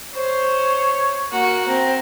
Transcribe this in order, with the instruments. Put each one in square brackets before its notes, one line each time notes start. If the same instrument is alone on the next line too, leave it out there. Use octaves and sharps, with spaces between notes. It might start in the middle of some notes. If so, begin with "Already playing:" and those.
[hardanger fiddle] C5 [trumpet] C#5
[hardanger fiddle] A#3 F#4
[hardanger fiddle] C4 [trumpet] A#5